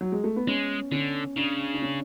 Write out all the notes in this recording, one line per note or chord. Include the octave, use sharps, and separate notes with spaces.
F#3
G#3
A3
B3
G#3 C#4
D3 C#4
C#3 D4
D4
C#4